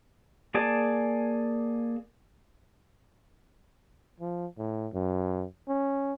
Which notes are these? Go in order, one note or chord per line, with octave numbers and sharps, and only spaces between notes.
A#3 G#4 D5 G#5 A5
F3
A2
F#2
C#4